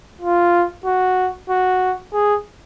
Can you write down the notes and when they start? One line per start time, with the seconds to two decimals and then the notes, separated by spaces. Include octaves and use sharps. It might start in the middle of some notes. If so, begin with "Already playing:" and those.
0.21 F4
0.85 F#4
1.49 F#4
2.13 G#4